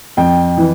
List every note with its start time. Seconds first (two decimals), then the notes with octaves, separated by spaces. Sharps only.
0.17 F2 G5
0.57 E3